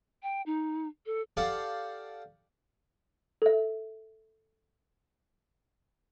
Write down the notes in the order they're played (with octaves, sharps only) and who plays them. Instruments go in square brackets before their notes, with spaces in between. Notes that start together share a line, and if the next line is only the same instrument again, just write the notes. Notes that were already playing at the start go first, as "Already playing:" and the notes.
[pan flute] G5
D#4
A4
[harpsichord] G4 A4 D5 F5 F#5 A5
[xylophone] A4 E5